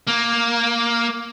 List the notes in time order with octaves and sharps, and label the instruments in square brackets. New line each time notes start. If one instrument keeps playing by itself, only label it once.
[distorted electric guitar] A#3